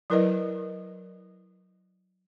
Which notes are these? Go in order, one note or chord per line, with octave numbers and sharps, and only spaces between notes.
F#3 E4 A#4 B4 D5 D#5